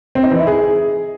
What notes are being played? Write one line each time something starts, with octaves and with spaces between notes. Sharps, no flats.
C4
D#4
E3
E4
G#4